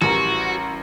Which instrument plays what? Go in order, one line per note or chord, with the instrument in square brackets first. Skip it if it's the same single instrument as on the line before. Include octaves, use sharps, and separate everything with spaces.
[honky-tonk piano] A1 G3 A#4 [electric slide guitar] F#4